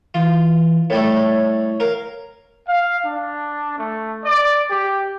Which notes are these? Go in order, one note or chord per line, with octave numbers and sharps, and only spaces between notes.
E3 F4
A2 G3 A3 C#5
A#4 F5
F5
D4
A3
D5
G4